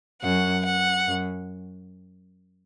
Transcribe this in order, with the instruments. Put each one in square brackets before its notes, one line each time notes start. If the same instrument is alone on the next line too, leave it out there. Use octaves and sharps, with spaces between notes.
[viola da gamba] F#2 [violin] F#5
[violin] F#5
[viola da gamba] F#2